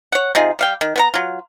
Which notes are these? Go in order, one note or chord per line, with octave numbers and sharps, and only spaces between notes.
C#5 F#5
C3 D#4 F4 G#4
G3 F5 G5
D#3
B3 B4 A#5
F#3 F4